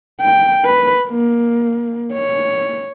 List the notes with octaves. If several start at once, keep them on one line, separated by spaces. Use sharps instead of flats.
G5
B4
A#3
C#5